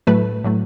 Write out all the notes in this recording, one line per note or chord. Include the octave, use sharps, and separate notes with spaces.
A2 F#3 A3 B4
A2 F#3 A3